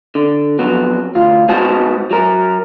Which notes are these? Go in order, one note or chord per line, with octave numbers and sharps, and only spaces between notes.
D3
F2 F#3 B3
D2 F4
G#2 B3 F#4 C5 A5
F#3 A#4